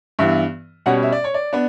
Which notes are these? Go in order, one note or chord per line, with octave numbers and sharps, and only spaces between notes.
G2 E3 B3 E5
B2 G3 C#4 F#5
E5
D5
C#5
D5
B3 D4